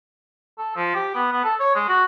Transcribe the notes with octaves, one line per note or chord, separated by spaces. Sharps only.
A4
F3
G4
B3
B3
A4
C#5
G#3
F#4